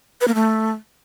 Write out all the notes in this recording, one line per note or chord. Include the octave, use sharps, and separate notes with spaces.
B4
A#3
A3